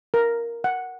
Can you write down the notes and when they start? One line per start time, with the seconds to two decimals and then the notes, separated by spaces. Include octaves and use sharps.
0.14 A#4
0.64 F#5